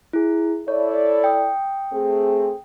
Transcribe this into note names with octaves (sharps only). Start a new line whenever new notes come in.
E4 G#4
E4 A4 C#5 D5
G5 D#6
A3 C4 G#4